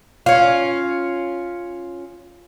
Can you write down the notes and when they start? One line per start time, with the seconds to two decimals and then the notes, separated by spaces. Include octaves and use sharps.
0.26 C#4 F4